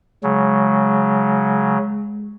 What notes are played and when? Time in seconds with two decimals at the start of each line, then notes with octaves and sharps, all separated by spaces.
0.23 C#3 F#3 G#3